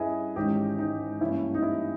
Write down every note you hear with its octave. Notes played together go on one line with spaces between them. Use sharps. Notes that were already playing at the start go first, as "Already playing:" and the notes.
Already playing: G2 G3 C#4 E4 G#4 B4 D#5
G#1 G#2 E3 G#3 C#4 D#4 G4
D#4
G2 E3 G3 A#3 C#4 E4
D#4
E4